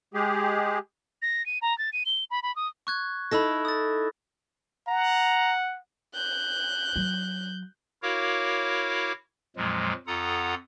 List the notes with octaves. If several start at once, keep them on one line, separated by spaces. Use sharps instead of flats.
G#3 G4 G#4
A#6
D#7
A#5
A6
D#7
G7
B5
B5
D#6
C#6 F#6 G#6
D#4 E4 A4 B5 E6 A#6
D#6 A6
F#5 A#5
F#6 G6
F#3
E4 F#4 A#4 C#5 F5 D6
F2 A#2 F3 F#3 G#3
F2 F4 A4 F#5 A#5 D#6